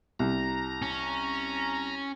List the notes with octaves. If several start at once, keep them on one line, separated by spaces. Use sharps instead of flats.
C2 A#5
C#4